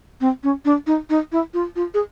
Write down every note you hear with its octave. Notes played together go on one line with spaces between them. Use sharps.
C4
C#4
D4
D#4
D#4
E4
F4
F4
G#4